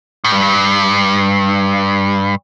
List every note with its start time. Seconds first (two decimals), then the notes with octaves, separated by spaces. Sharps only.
0.24 A2
0.32 G2